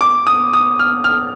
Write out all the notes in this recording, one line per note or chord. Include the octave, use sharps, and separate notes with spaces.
D6
D#6
D#6
F6
F6